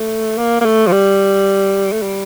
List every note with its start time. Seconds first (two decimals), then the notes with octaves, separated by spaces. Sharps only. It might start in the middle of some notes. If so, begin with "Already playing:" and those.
Already playing: A3
0.38 A#3
0.61 A#3
0.65 A3
0.87 F3
0.92 G3
1.92 A3
2.02 G3